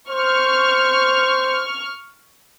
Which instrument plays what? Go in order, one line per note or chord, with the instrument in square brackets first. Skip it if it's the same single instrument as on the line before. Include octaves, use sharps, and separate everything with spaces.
[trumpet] C5 [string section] C#6 F6